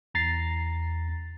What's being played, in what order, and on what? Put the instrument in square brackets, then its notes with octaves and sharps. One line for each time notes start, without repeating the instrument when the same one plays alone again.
[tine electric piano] E2 A#5 A6 C7